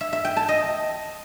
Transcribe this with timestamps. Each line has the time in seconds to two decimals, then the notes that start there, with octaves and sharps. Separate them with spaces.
0.01 E5
0.13 E5
0.25 G5
0.37 A5
0.49 D#5